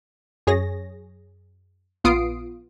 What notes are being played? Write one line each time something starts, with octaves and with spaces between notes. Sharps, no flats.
F#2 G#4 C#5 A#6
A#1 B3 F4 D#6 C7 D7